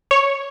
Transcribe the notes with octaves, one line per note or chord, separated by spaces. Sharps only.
C#5